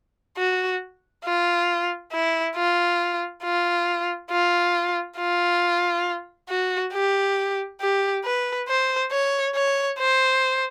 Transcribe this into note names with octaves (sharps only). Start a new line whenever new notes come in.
F#4
F4
E4
F4
F4
F4
F4
F#4
G4
G4
B4
C5
C#5
C#5
C5